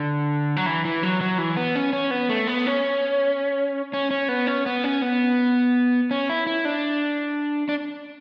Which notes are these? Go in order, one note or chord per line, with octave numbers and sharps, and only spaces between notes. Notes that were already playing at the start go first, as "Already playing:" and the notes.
Already playing: D3
F#3
E3
E3
F#3
F#3
E3
B3
C#4
C#4
B3
A3
B3
C#4
C#4
C#4
B3
C#4
B3
C#4
B3
C#4
E4
E4
D4
D4